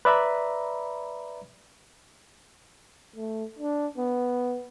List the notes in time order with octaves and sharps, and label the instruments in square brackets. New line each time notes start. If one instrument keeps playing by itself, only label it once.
[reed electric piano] B4 D5 E5 A#5 B5
[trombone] A3
D4
B3